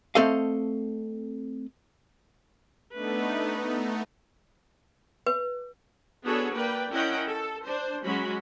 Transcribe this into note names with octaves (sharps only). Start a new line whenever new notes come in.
A3 C4 A4 D#5 F5
A3 B3 D4 D#4 B4
B4
B3 D4 F#4 G#4 A4 C#5
A#3 B4 D5 G5
C#4 E4 A#4 D#5 F#5 G5
A4
D4 C5
F#3 G#3 C#4 F#4 B5